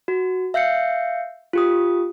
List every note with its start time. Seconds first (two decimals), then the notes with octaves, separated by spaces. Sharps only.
0.08 F#4
0.54 E5 F5 G6 C7 C#7
1.53 F4 G4 D#6